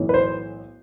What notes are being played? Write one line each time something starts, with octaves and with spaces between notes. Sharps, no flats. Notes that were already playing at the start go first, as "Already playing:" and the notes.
Already playing: B1 A2 E3
B4
C5